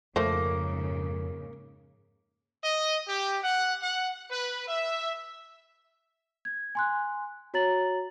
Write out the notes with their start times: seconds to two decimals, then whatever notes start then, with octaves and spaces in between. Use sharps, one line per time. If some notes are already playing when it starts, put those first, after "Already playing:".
0.16 F2 G#2 C#3 A3 A#3 C5
2.62 D#5
3.07 G4
3.43 F#5
3.81 F#5
4.30 B4
4.68 E5
6.45 G#6
6.75 G#5 C6 F#6
7.54 F#4 C#5 A#5 A6 F#7